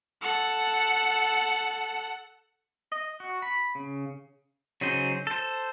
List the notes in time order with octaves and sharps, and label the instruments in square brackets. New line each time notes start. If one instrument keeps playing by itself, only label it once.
[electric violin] A4 F#5
[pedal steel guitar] D#5
F#4
B5
C#3
C#3 F#3 D#4 G#4 C5
A4 C5